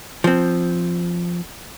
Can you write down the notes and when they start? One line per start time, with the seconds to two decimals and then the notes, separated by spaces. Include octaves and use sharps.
0.24 F3 C4